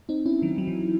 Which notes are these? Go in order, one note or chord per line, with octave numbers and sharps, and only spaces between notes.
C4 D#4
C#4 E4
D#3 F#3
F#3
E3